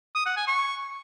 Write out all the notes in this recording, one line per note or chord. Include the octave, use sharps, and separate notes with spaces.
D#6
F#5
G#5
C#6